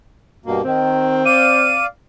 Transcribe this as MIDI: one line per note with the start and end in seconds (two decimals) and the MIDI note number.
0.46 0.61 43
0.46 0.61 47
0.46 0.61 58
0.64 1.23 51
0.64 1.83 60
1.26 1.86 74
1.26 1.86 77
1.26 1.84 99